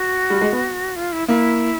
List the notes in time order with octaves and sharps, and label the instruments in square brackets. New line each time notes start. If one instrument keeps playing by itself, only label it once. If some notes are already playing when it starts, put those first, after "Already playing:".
Already playing: [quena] F#4
[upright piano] G3
G#3
B3
[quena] F4
E4
[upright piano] A#3 [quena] E4